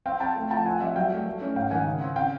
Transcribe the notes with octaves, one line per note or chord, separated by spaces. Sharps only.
C4 F5 G5
C4 G5 A5
A3
F3 G5 A5
C4 F#5 G#5
G3 E5 F#5
F#3 F5 G5
A3
A3
C#4
G#2 F5 G5
D#3 F#5 G#5
C#3
C4
C#3 F5 G5